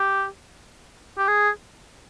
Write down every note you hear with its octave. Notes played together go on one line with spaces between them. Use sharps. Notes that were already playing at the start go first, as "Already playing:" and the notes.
Already playing: G4
G4
G#4